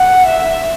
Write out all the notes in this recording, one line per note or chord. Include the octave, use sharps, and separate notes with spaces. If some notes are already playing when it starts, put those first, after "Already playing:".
Already playing: F#5
E5